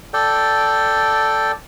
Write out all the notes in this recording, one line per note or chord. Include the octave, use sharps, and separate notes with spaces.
A4 D5 G5